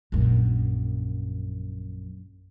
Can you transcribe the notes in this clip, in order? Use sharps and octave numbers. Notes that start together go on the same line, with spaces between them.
A#1 F#2